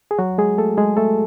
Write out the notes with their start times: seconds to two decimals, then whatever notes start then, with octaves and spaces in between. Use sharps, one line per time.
0.11 G#4
0.19 F#3 F#4
0.38 G#3 G#4
0.58 A3 A4
0.78 G#3 G#4
0.97 A3 A4